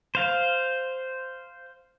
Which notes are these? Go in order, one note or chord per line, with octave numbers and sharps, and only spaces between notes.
C5 F5